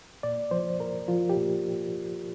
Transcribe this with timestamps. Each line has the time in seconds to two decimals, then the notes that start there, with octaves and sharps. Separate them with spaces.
0.23 A#2 D5
0.51 F3 C5
0.80 A#2 A#4
1.08 F3 F4
1.30 G4
1.36 A#2